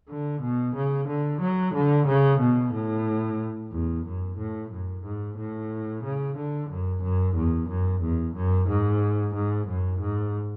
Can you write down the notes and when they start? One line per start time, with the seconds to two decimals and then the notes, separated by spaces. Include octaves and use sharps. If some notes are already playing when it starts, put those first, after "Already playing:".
0.09 D3
0.42 B2
0.75 C#3
1.08 D3
1.41 F#3
1.74 D3
2.07 C#3
2.40 B2
2.73 A2
3.72 E2
4.05 F#2
4.38 A2
4.72 F#2
5.04 G#2
5.37 A2
6.04 C#3
6.37 D3
6.70 F#2
7.03 F#2
7.36 E2
7.69 F#2
8.02 E2
8.35 F#2
8.69 G#2
9.35 G#2
9.67 F#2
10.00 G#2